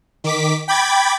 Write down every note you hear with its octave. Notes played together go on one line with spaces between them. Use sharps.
D#3 D6 B6
G5 B5 D6 G#6 A6 B6